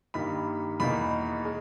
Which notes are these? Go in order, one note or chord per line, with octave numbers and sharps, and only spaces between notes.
G2 D#3 A#3 B5
E2 B2 A#3 D#4 B5
G#3